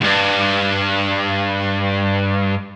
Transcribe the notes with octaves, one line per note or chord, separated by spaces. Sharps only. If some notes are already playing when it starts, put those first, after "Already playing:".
D2 G2